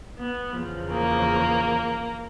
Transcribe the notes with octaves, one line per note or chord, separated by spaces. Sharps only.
B3
E2 C#3 F3
A#3